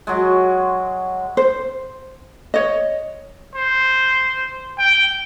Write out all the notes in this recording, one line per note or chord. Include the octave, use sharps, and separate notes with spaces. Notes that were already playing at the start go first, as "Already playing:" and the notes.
F#3 G#3
C5
C#5 D#5
C5
G5